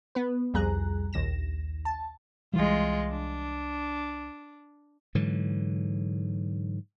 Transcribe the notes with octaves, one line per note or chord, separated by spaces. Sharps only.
B3 B4
C2 F2 G3 G#4 A#5 F#6
A#1 D#2 A#6 E7
A5
C2 E3 G3 G#3 F4
D4
G#2 D3 E3 F#3